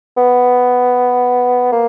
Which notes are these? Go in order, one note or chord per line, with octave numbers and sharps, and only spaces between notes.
B3
A#3